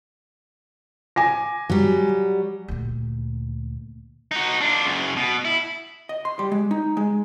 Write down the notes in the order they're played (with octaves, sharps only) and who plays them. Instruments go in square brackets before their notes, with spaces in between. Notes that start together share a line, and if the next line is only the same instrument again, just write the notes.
[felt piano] G#5 D6 A#6
[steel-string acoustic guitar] F#3 G3
[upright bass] D2 A#2
[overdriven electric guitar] D#4 F#4
D4 F4
F#2 C#3
B2
E4
[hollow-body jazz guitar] D#5
C6
G3
G#3
D#4
G#3